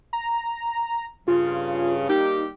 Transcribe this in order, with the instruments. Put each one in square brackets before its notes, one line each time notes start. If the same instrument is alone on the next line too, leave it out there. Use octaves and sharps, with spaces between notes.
[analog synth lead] A#5
[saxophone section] G2 C#3 [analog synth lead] F4
[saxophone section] G3 A#3 G4 [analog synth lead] D#4